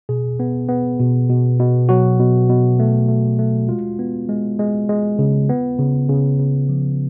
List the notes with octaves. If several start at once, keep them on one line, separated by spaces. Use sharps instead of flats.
B2 G#4
B3
B3
B2
B2
B2
F#3 F#4
B2
B2
A3
A3
A3
G#3 F4
B3
G#3
G#3
G#3
C#3
B3
C#3
C#3
C#3
F3